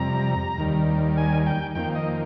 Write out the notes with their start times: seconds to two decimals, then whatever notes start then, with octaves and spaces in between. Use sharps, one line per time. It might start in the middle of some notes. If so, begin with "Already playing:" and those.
Already playing: F2 C3 G3 A#5
0.58 D#2 D#3 G3
1.17 G#5
1.46 G5
1.75 F2 D#3 A#3 G5
1.95 D#5